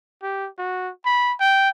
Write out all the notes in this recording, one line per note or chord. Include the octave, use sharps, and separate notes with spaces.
G4
F#4
B5
G5